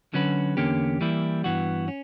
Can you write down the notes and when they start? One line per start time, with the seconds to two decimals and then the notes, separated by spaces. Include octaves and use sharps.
0.14 D3 F#3 C#4 F#4 B4
0.57 E2 D3 A#3 C#4 G4
1.01 E3 G3 A#3 E4
1.44 G2 E3 B3 F#4
1.88 C#4